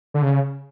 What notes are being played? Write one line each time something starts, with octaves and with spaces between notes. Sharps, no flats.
D3
C#3